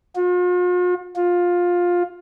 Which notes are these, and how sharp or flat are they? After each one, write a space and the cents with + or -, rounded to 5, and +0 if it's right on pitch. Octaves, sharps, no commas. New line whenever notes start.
F4 +45
F4 +15